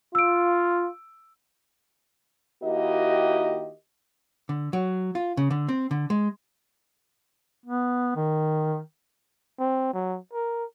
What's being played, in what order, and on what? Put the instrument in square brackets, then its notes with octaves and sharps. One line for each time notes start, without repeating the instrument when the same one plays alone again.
[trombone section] F4 [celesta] E6 D7
[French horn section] D#3 A#3 E4 F#4 G4 D#5
[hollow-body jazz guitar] D3
F#3
F4
C#3
D3
C4
D3
G#3
[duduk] B3
D#3
[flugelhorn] C4
F#3
A#4